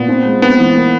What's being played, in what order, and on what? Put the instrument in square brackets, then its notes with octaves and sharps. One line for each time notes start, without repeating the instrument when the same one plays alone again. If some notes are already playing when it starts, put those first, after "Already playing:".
Already playing: [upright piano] A#2 [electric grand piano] B3
[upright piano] C4
G#3
[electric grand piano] B3 [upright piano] C4
[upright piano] E3
A#3